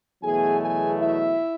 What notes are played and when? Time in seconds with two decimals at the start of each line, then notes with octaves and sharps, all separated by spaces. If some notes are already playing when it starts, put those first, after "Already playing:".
0.23 E2 B2 F#3 A3 G#4 G#5
0.60 G#4 G#5
0.97 E4 E5